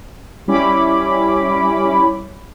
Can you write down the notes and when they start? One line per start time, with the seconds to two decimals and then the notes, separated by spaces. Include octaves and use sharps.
0.48 G3 C#4 E4 B5 D6